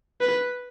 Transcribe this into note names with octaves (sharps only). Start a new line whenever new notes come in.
B4